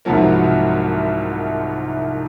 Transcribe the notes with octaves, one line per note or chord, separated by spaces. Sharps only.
C2 G#2 C3 F3 F#3 A#3